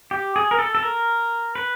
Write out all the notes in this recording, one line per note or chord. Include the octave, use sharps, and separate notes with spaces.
G4
G#4
A#4
A4
A4
A#4
B4